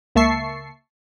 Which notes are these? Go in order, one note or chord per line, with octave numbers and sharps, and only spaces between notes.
C#2 A#3 E5 A5 C#6 C7